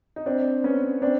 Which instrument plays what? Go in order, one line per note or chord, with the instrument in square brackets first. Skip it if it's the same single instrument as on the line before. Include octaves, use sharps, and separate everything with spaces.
[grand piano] D#4
C4 D4
B3 C#4
C4 D4